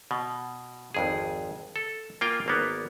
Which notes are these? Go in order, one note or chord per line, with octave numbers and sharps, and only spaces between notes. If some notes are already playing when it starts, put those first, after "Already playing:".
B2
G#1 F2 G#4
A4
A#3 F4 G5 G#5
G#1 A#3 B3